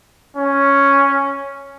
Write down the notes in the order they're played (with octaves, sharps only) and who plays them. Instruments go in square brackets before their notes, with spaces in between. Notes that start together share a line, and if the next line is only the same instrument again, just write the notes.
[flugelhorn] C#4